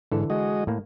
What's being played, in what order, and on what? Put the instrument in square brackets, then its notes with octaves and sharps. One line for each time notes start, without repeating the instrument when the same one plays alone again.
[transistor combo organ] G#2 [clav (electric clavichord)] D3 E3 A4
[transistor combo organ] G#3 F#4 D#5
[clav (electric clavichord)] A2 A#3